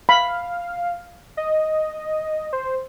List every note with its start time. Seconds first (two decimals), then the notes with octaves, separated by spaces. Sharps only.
0.09 F5 B5
1.37 D#5
2.53 C5